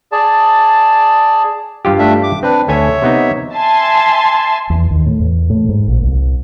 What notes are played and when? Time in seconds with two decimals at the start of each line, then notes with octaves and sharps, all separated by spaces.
0.12 G#4 D5 A5
1.85 G2 F4 G4
1.99 A3 D4 E5
2.23 D6
2.43 C4 D4 B4
2.68 D2 A4 C#5 E5 G#5
3.02 C3 B3 D#4
3.53 E5 G#5 A5 C6
4.70 E2
4.91 D#2
5.06 A2
5.20 E2
5.50 A2
5.69 G#2
5.88 A#1
6.03 C2